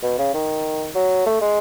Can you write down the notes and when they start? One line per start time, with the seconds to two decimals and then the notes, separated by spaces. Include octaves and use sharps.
0.03 B2
0.19 C#3
0.34 D#3
0.95 F#3
1.26 A3
1.42 G#3